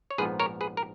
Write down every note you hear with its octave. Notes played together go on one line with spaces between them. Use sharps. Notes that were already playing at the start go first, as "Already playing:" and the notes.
C#5
A#1 G#2 F3 B3 G#4 B4
A#4 C#5
G#4 B4
A#4